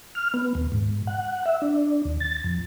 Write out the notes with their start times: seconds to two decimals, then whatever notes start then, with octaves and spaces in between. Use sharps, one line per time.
0.15 F6
0.34 B3
0.55 D#2
0.72 G#2
1.07 F#5
1.46 E5
1.62 D4
2.05 D#2
2.20 A6
2.44 F2